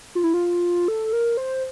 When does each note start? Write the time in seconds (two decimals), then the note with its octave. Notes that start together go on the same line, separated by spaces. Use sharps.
0.15 F4
0.24 E4
0.34 F4
0.88 A4
1.13 A#4
1.37 C5